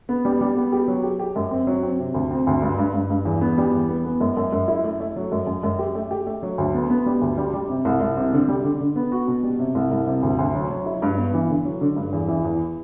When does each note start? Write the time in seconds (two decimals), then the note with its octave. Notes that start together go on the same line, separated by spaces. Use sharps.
0.09 B3
0.25 G3
0.41 G3
0.56 B3
0.72 G4
0.88 F#3
1.03 G4
1.19 G4
1.36 F#2
1.51 C4
1.67 F#3
1.83 C4
1.99 C3
2.14 D2
2.31 C4
2.47 D2
2.62 G2
2.78 G2
2.94 G2
3.10 G2
3.25 E2
3.41 B3
3.58 G3
3.73 E2
3.89 B3
4.05 B3
4.21 F#2
4.37 F#2
4.53 F#2
4.68 E4
4.84 A3
5.00 A3
5.16 F#3
5.32 F#2
5.47 F#2
5.63 F#2
5.79 G4
5.95 A3
6.11 G4
6.26 A3
6.43 F#3
6.58 D2
6.74 B3
6.90 B3
7.06 G3
7.22 D2
7.37 G3
7.54 G3
7.69 C3
7.85 C2
8.01 C2
8.17 C3
8.33 D3
8.49 G3
8.64 D3
8.80 D3
8.96 B3
9.12 F#4
9.28 B2
9.43 G3
9.59 C3
9.75 C2
9.91 C2
10.07 C3
10.23 D2
10.39 D2
10.54 F#3
10.70 F#3
10.86 E4
11.02 G2
11.18 B3
11.34 E3
11.50 D3
11.65 F#3
11.81 D3
11.96 G2
12.13 E2
12.28 E3
12.44 E2